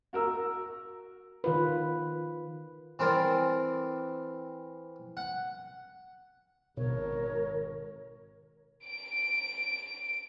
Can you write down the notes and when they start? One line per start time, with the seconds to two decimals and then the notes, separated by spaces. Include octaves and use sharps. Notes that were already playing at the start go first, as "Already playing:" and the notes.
0.13 F#4 A#4 E6
1.44 D#3 F4 B4
2.99 E3 C4 A#4 D5
5.17 F#5
6.77 G#1 B2 A#4 C#5
8.86 D7